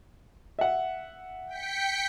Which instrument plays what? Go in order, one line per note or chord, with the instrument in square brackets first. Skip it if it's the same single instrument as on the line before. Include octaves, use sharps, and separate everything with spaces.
[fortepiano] E5 F#5
[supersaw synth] G5 B6 C#7